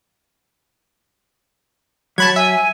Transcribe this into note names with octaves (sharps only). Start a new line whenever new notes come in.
F#3 A5 B5 G#6
E5 G#5